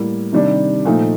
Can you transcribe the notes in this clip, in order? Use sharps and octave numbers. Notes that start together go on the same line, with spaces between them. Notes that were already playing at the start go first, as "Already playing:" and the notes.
Already playing: A2 G3 A#3
C3 D#3 G3 D4
A#2 F3 A3 D#4